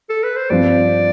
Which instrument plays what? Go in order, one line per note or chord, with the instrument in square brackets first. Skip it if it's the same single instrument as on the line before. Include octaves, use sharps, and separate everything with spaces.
[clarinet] A4
B4
C5
[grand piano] G2 F3 C4 F4 [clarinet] D5